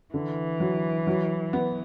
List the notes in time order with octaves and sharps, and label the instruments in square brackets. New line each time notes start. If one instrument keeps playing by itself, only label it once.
[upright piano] D3 [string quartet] E3
[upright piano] F#3
F#3
B3